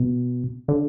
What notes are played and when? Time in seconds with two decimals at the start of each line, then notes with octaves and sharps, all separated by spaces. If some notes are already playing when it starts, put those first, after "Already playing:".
Already playing: B2
0.68 D3